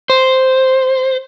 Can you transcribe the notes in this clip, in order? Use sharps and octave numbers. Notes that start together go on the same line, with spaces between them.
C5